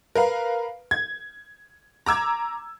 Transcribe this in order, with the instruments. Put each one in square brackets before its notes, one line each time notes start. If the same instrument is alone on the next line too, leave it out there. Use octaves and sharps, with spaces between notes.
[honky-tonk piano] A#4 B4 F5
G#6
A#5 D6 E6 G#6